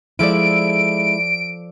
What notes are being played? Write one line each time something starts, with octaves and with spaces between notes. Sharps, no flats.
F3 G#3 E4 A4 D5 D7